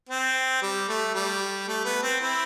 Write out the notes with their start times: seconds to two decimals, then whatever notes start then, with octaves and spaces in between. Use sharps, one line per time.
0.09 C4
0.62 G3
0.88 A3
1.14 G3
1.68 A3
1.85 B3
2.03 C4
2.20 C4 E4